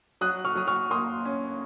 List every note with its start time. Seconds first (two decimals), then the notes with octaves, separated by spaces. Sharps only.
0.21 F#3 D#6 F#6
0.45 C#6 F6
0.55 F#3 D#6
0.67 C#6 F6
0.90 A#3 C6 D#6
1.25 C#4